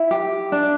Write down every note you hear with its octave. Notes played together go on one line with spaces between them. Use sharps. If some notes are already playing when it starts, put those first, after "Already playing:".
Already playing: E4 E5
G4
D4